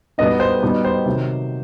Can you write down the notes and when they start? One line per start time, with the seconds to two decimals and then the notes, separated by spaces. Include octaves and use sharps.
0.18 B2 G3 B3 D#4 D#5
0.40 C5
0.62 B2 G3 B3 D#4
0.85 C5
1.06 C3 D#3 F#3